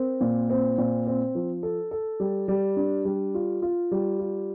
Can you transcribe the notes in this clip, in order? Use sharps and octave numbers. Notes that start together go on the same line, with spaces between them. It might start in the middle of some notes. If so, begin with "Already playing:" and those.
Already playing: C4 A#4
A#2
C4
A#2
C4
F3
A4
A4
G3
G3
D4
G3
F4
F4
G3
F4